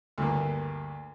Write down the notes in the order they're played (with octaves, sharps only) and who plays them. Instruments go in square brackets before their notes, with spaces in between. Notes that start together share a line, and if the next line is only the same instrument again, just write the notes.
[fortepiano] D2 G2 A#3